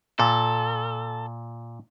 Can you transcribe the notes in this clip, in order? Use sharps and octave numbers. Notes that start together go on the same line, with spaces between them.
A#2 A4